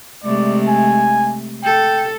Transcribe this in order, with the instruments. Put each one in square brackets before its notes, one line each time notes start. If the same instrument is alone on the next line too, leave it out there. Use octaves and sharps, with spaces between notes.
[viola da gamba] C3 G#3 A3 [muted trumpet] D5
[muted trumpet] G#5
[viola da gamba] A4 [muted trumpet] G5